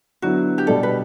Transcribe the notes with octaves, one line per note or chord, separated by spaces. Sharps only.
D3 F#3 B3 E4 F#4
G4
B2 G3 D4 A4
B4